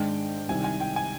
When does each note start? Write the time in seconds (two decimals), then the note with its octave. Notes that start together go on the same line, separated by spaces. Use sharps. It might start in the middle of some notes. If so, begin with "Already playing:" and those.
Already playing: G#2 D#3 G#3 D4 G5
0.48 C2 C3 D#3 G#5
0.64 G#5
0.80 G5
0.96 G#5